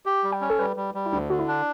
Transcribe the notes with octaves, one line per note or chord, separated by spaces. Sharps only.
G4
G3
G5
C#4
A4
G3 B4
G3
G3
E4
D2 D4
D3 F#4
E4
D4